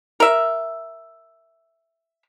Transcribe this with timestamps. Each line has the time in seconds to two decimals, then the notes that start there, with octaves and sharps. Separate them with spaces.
0.20 A#4 E5